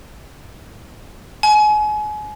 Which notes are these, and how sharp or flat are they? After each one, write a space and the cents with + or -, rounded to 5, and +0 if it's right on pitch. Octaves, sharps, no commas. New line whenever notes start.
G#5 +35